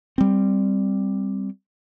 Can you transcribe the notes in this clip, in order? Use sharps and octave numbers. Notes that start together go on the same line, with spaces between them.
G3 C4